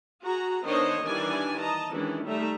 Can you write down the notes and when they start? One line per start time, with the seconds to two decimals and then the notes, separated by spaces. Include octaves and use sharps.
0.22 F#4 G#4 A#5
0.65 D#3 B3 D4 C5 C#5 D#5
1.04 D#3 E3 G3 D4 D5 G#5
1.61 D#5 A5 A#5
1.92 D#3 E3 G#3 C#4 D4 E4
2.25 G3 A3 D#4 E5 A#5